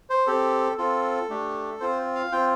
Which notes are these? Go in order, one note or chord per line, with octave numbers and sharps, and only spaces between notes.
C5
C4 G4 A4
C4 F4 A4
A3 D4 G4
C4 F4 C5
F5
C4 F4 G5